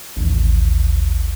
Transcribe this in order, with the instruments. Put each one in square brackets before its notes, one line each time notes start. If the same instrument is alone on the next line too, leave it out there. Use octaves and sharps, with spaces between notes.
[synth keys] A1 D#2